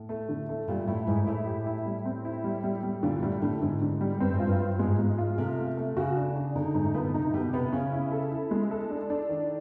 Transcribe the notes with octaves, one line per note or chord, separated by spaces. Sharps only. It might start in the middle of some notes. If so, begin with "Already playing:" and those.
Already playing: A2
A3
D3
A3
A#2 G3
A2 E4
G#2 E4
A2 E4
G4
E4
G3
C4
E4
G3
G3
G3
A#2 D3
A2 G3
A2 D3
G#2 D3
D3
G3
G2 C4
G#2
F4
G2
F4
G#2 G#3
G#3
F4
C3 A3
A3
A3
C#3 F#4
D4
D4
D3 D#4
G#2 D#4
A2
A#2 B3
B2
C3 D#4
B2 G4
C3 B3
C#3 C#4
E4
A4
E4
G#3
A4
D4
D4
D#3